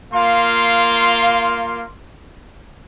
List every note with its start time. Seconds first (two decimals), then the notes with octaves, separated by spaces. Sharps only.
0.12 A#3 F4 F5 C6